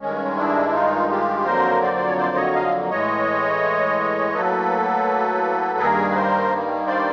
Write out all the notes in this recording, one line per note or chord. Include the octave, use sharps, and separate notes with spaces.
G2 D#3 G#3 C#4
D4 E4
D#4 F4
F4 G4
F2 D3 F#3 A#3 A#4 C5
C5 D5
C5
C#5
C5 D5
C#5 D#5
D#5 F5
A2 E3 G#3 C#5 D#5
A2 F#3 A#3 A4 B4
G2 D#3 G3 A#3 G#4 A#4
B4
A#4 C5
C5 D5